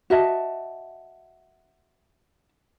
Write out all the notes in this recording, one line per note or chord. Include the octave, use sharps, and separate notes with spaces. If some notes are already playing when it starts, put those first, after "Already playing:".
F#4 D#5 E5 A5